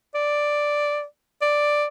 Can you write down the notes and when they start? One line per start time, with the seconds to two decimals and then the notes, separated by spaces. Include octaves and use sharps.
0.15 D5
1.42 D5